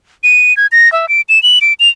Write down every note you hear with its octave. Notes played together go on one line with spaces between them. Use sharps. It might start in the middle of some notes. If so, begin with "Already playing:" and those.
D#7
G#6
A#6
E5
D7
E7
F#7
D7
F7